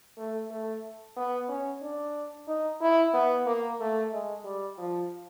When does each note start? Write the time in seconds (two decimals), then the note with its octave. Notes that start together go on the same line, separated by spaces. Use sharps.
0.18 A3
0.51 A3
1.17 B3
1.49 C#4
1.82 D4
2.48 D#4
2.81 E4
3.14 B3
3.46 A#3
3.80 A3
4.13 G#3
4.45 G3
4.78 F3